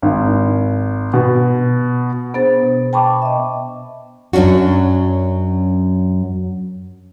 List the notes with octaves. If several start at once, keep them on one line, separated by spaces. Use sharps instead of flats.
G#1
B2
B3 D4 G#4 C5 A6
B2
G5 A5 B5 C#6 D6
D#5 E5
F#2 F#3 C#4 D4 F#4